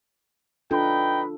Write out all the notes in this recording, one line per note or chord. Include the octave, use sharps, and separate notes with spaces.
D4 D#4 F4 A4 B4 G5